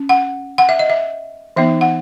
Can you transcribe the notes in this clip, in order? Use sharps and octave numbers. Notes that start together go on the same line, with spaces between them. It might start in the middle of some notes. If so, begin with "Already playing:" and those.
Already playing: C#4
F#5
F#5
E5
D#5
E5
E3 B3 D#4 E5
F#5